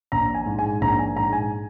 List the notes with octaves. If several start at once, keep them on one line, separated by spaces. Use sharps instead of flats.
A#1 A#5
G#5
G#2
G#5
A#1 A#5
G#5
G#2 A#5
G#5